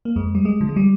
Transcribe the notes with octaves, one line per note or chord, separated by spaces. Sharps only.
A#3
F2 G#3
G3
G#3
D3 F3
G#3
G3